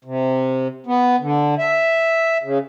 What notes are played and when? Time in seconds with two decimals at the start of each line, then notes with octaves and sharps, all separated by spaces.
0.05 C3
0.86 B3
1.20 D3
1.59 E5
2.43 C#3